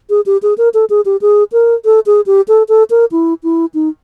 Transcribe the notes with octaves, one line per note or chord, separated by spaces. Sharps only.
G#4
G4
G#4
A#4
A4
G#4
G4
G#4
A#4
A4
G#4
G4
A4
A4
A#4
E4
E4
D#4